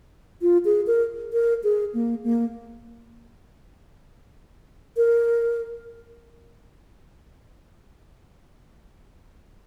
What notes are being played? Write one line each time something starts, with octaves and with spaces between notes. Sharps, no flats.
F4
G#4
A#4
A#4
G#4
A#3
A#3
A#4